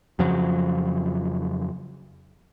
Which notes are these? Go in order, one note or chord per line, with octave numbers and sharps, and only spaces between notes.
F2 C#3 F3 F#3